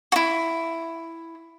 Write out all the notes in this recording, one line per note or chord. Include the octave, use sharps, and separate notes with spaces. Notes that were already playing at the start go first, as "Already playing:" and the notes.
E4 F#4